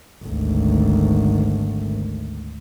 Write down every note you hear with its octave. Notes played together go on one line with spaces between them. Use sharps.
G#1 D2